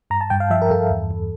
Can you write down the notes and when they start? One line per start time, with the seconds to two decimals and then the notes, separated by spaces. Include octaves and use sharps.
0.10 G2 A#5
0.21 A5
0.30 G2 G5
0.40 F5
0.50 F3 E5
0.62 A#4
0.70 G2 A4
0.90 E2
1.11 E2